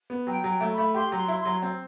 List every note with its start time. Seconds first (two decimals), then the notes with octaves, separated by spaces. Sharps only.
0.10 B3
0.27 F#3 G5
0.44 F#3
0.49 G5
0.61 A3
0.72 B5
0.78 A3
0.95 G4 C6
1.12 F#3 C6
1.28 E4
1.40 C6
1.46 F#3
1.62 C4